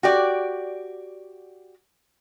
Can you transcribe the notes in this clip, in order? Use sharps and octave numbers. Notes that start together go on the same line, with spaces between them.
F#4 G4 D5